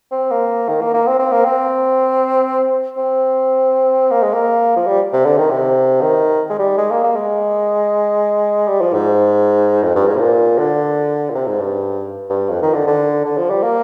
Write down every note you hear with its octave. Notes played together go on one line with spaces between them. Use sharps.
C4
A#3
D#3
A#3
A#3
C4
C4
A#3
C4
C4
A#3
G#3
A#3
F3
G3
C3
D3
D#3
C3
D#3
G#3
G3
G#3
A#3
A#3
G#3
G3
F3
G#2
F2
G2
G#2
C3
A#2
D3
A#2
C3
G#2
G2
G2
F2
D#3
D3
D3
D3
F3
G3
A#3